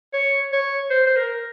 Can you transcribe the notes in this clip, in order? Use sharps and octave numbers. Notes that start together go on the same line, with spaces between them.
C#5
C#5
C5
C5
A#4